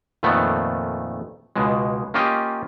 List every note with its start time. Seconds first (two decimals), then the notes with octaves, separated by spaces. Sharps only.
0.23 F2 A#2 D#3 A3 B3
1.56 C#2 B2 G#3
2.14 A#3 C#4 F4 G4 D#5 F5